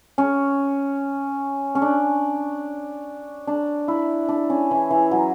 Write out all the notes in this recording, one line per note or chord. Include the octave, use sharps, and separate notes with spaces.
C#4
C#4
D4
D4
E4
D4
C#4
E3
E3
F#3